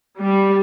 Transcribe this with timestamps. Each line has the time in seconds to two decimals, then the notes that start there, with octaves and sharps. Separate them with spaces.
0.19 G3